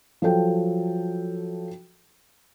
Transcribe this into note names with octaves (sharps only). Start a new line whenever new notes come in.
F3 F#3 A4 G5